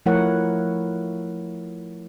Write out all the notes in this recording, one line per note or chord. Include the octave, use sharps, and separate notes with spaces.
F3 A3 E4 A#4 C#5 F#5